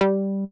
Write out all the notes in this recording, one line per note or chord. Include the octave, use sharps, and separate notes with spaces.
G3